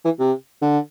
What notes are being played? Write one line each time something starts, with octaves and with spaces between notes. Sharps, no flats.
E3
C3
D3